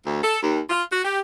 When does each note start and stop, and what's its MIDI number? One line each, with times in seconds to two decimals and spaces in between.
0.05 0.20 38
0.22 0.37 69
0.42 0.60 39
0.70 0.83 65
0.91 1.00 66
1.05 1.19 67